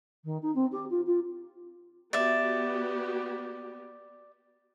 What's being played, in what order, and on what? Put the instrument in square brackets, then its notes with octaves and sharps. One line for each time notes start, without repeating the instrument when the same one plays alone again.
[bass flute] D#3
D#4
C4
G4
F4
F4
[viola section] B3 F#4 G4 [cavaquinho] D5 E5